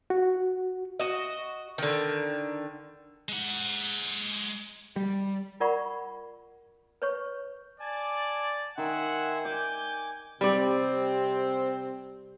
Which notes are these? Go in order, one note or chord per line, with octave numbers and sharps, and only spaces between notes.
F#4
F#4 D#5
D3 D#3
G#3 F#5
G3
F4 A#4 D5 F#5 B5 C#6
B4 C#5 C#6
D5 G#5 A5
D#3 E5 F#5 G#5 C6
D5 G#5 D6 G6
C3 G3 C4 D5